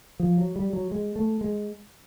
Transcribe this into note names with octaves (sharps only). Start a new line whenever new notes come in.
F3
F#3
G3
F#3
G#3
A3
G#3